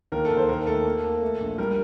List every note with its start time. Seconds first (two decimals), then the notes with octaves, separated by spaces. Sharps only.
0.12 D#2 A#4
0.25 A4
0.30 D#2
0.37 C5
0.48 D#2 A#4
0.67 A3 A4
0.85 A#3
1.04 A#3
1.22 A3
1.40 A#1
1.58 G3 A#4